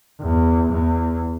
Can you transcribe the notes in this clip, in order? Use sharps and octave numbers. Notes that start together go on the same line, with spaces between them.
E2
E2